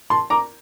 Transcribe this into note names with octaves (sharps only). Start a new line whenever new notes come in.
A5 C6
A#5 D6